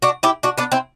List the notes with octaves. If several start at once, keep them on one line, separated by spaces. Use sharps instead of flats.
D4 F#4
E4 G4
D4 F#4
B3 D4
C4 E4